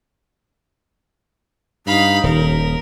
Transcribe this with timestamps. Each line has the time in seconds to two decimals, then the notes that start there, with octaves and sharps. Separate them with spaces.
1.87 G2 D#4 F5 B5
2.23 D#1 D#2 A#4